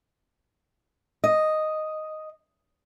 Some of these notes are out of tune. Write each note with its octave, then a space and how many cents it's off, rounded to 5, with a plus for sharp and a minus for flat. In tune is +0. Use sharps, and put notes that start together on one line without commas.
D#5 +0